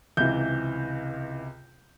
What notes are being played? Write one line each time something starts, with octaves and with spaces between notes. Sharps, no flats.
C#2 C3 E3 G6